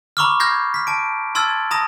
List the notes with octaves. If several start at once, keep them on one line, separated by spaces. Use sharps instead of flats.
A#5 B5 C#6 D6 E6 F6
F6 G6 G#6 A#6 C7
F6 B6
A5 D7
A5 C6 E6 F6 G#6 A6
A5 A#5 D#6 A#6